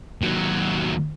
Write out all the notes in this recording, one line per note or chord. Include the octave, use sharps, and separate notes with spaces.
D#2 F#3